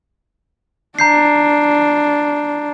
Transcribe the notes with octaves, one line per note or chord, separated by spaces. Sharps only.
D4 A#5 G6 C7